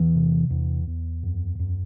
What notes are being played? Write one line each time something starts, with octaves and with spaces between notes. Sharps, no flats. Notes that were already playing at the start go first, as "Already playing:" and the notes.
Already playing: E2 E3
C3
E2
E2
F#2
F#2